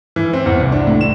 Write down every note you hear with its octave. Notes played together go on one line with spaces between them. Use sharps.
E3
C4
E2
C2
D4
A2
E7